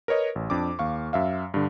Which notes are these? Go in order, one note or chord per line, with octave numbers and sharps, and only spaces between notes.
A#4 B4 C#5 D#5
A1
F2 D4 D6
D#2 F5 C#6
F#2 E5 F5
G2 D3